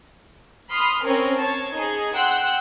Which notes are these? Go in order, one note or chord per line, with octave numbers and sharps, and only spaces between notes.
B5 C6 D#6 F6
C4 C#4 A#4
C#5 A5 G#6
D#4 G#4
F#5 G5 C6 E6 F#6